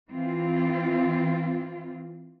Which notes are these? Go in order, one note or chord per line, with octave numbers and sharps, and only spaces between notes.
E3 C4 F4